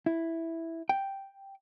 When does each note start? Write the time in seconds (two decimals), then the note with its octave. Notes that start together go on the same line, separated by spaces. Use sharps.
0.06 E4
0.89 G5